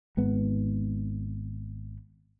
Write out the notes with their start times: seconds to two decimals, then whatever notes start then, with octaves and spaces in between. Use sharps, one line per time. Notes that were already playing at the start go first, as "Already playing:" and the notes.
0.17 G#1 G#2 B3